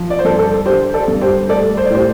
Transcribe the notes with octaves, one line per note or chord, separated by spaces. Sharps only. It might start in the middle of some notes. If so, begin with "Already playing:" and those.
Already playing: F3
D5
C5
G2 A4 D5
A4
D3 G4 C5
A4 D5
G2
G4 C5
A3 A4 D5
C5
D5
A2 G4 C5